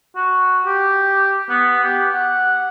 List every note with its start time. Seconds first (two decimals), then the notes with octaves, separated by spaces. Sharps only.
0.16 F#4
0.66 G4
1.49 B3
1.84 G4
2.12 F#5